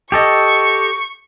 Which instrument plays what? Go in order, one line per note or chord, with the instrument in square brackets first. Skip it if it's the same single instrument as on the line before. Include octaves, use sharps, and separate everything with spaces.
[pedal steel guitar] G4 A4 D#5 [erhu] C#6